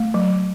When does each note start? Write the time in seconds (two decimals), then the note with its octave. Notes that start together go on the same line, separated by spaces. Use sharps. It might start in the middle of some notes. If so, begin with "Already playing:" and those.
Already playing: A3
0.14 F#3